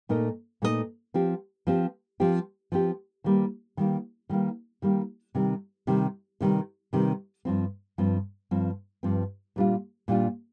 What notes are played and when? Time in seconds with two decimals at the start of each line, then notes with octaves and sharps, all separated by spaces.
0.09 A#2 A3 D#4 A#4 D#5
0.62 A#2 A3 D#4 A#4 D#5
1.14 F3 C4 G4
1.67 F3 C4 G4
2.20 F3 C4 G4
2.72 F3 C4 G4
3.24 D#3 G3 A#3
3.77 D#3 G3 A#3
4.29 D#3 G3 A#3
4.82 D#3 G3 A#3
5.35 C3 D#3 G3
5.87 C3 D#3 G3
6.41 C3 D#3 G3
6.93 C3 D#3 G3
7.45 G2 F3 C4
7.98 G2 F3 C4
8.51 G2 F3 C4
9.03 G2 F3 C4
9.56 A#2 G3 D4 F4
10.08 A#2 G3 D4 F4